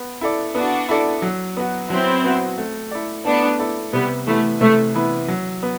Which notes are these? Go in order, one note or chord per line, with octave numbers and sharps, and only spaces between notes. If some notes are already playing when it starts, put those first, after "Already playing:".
Already playing: B3
E4 A4 D5
B3 D4 F#4
E4 A4 D5
F#3
B3 F#4
F#3 C4 E4
B3 F#4
A3
E4 A4 D5
A3 B3 D4
E4 A4 D5
C3 G3 B3
E3 A3 B3 E4 B4
C3 A3
E3 B3 E4 B4
F#3
B3